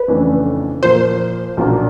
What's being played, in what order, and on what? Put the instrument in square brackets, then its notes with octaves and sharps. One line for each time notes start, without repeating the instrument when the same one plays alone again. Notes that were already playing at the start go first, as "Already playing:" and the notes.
Already playing: [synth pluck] B4
[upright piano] F2 C#3 E3 A3 D4
[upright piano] A#2 F3 A#3 [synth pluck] C5
[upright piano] B1 A#2 F3 A#3 D4